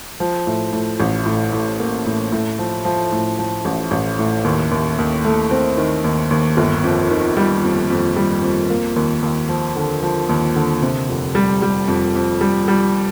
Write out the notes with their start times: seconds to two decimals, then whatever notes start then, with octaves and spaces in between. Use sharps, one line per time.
0.20 F3
0.47 A2
0.73 A2
1.00 A1
1.26 A2
1.53 A2
1.80 A#3
2.06 A2
2.32 A2
2.59 F3
2.85 F3
3.12 A2
3.39 F3
3.65 A1
3.91 A1
4.19 A2
4.44 D#2
4.71 D#2
4.98 D#2
5.25 A3
5.51 C4
5.78 D#3
6.04 D#2
6.31 D#2
6.57 G1
6.84 F2
7.10 D#3
7.37 G3
7.64 F2
7.90 F2
8.16 G3
8.43 F2
8.70 A#3
8.96 D#2
9.23 D#2
9.49 F3
9.76 D3
10.03 F3
10.29 D#2
10.56 D3
10.82 C3
11.09 F1
11.35 G3
11.62 G3
11.88 F2
12.15 F2
12.41 G3
12.68 G3